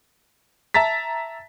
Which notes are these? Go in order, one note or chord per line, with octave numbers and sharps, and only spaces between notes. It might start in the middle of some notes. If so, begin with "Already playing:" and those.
E5 A5 A#5 A6 B6